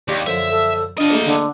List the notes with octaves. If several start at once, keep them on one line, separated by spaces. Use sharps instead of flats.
D#2 D4 F4 G4
F#2 D3 F3 E5
A4
D4 F4 D#5
A#1 A3 D#4
D3